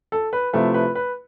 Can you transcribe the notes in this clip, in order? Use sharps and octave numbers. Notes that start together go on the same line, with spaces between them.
A4
B4
C3 F3 A3 E4 B4
B4
B4